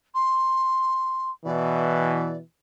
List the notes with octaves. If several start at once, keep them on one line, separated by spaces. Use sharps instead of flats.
C6
B2 E3 D5